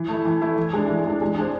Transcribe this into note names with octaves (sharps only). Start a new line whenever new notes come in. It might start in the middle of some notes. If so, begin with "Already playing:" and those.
Already playing: E3
A3 E4
E3
A3 E4
E3
G#3 D4
E3
G#3 D4
G#3
D4 G#4 C5